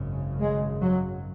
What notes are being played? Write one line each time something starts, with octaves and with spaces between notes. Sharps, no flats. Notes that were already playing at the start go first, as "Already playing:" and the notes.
Already playing: G#1 F#2 C#3
G#3
F#3